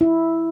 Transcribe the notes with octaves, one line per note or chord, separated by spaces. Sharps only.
E4